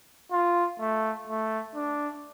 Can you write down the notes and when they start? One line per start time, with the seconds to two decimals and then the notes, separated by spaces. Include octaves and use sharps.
0.32 F4
0.79 A3
1.27 A3
1.75 D4